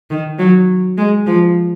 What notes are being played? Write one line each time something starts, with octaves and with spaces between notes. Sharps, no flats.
D#3
F#3
G#3
F3